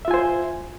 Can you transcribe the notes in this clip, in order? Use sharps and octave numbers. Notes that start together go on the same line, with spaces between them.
F4 C5 E5 G#5